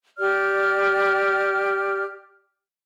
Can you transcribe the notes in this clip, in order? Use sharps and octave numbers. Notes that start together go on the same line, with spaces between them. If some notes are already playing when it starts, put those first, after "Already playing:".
G4 D5 F6